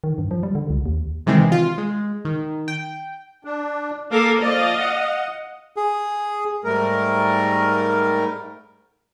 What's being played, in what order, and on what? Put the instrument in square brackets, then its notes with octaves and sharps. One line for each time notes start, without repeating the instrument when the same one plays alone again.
[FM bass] D#3
G2
F3
G3
D3
C#2
D#2
[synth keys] C3 D#3 E3 G#3 C4
F4
G#3
D#3
G5
[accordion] D4
[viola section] A#3 A4 A#4 [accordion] F5 D6
[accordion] F3 D5 [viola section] D#5 F5
[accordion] F#5
[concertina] G#4
[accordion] G#2 G3 A3 A#4